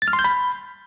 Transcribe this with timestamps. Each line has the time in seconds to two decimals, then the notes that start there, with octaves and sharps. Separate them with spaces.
0.02 A6
0.08 F6
0.13 C6
0.19 G6
0.24 B5